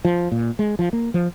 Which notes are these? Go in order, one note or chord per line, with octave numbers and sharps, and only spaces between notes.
F3
A#2
G#3
F3
A#3
F3